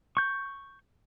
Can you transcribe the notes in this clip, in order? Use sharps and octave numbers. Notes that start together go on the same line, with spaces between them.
C#6 G6